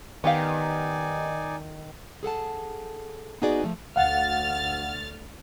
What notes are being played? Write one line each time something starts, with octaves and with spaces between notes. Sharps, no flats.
D#3 B3 D#4 G4 D5 F5 G#5
G#4 A4 F#5 A5
B3 D#4 F#4 G#4 B4 D5
F3 A3
D2 F5 F#5 F6 A6